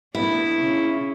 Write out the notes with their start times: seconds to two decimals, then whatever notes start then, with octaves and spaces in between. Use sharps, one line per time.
0.15 A3 B3 D4 E4
0.54 C#3 C#4